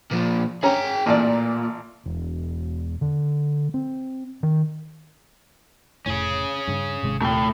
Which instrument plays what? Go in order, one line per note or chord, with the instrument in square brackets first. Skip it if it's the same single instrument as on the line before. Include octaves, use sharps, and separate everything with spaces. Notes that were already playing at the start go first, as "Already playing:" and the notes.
[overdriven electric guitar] A#2 F3
[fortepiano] C#4 A#5 [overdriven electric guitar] G#4 G5
[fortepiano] A1 D5 [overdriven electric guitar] A#2
[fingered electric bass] E1
D3
C4
D#3
[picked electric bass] F1 A2 [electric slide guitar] C#4 G#4
[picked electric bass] G2 C#3
G#1 C3 G#3
[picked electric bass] D#1 C3 [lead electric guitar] A3 G5